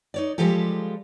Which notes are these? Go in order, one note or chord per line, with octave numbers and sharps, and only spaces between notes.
D#4 C#5 D5
F3 G3 G#3 F4 G4 A4